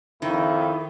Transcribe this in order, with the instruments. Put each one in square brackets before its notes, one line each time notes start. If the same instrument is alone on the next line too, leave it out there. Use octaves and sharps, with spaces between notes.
[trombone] F2 [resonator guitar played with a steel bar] D#3 [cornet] E4